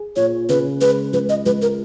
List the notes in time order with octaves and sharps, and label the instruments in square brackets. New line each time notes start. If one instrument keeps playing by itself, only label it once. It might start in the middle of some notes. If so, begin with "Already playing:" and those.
Already playing: [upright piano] G#4
[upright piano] A#2 [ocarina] C#5
[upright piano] C#3 [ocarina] B4
[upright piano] G#3 [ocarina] B4
[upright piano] C#2 [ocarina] B4
[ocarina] D#5
[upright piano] C#2 [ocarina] B4
[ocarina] A#4